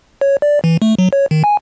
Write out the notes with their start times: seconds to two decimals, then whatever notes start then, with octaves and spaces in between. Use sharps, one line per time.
0.21 C#5
0.42 D5
0.64 E3
0.82 A3
0.99 F#3
1.13 C#5
1.31 D#3
1.44 G#5